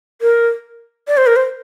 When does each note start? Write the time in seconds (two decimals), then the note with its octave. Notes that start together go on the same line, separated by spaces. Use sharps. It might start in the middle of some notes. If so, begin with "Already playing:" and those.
0.22 A#4
1.08 D5
1.17 C5
1.27 A#4
1.36 C5